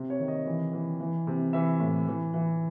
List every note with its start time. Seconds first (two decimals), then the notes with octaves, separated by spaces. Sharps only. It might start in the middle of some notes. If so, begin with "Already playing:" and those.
Already playing: C3
0.10 C#5
0.19 D#3
0.28 D#5
0.46 E3
0.73 E3
1.00 E3
1.27 C3
1.53 E3 E5
1.80 A2
2.08 E3
2.34 E3